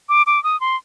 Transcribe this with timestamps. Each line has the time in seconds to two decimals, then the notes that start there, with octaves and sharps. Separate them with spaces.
0.09 D6
0.26 D6
0.44 D#6
0.61 C6